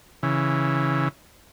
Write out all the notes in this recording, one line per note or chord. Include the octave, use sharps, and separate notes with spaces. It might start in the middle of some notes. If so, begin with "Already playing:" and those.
C#3 E3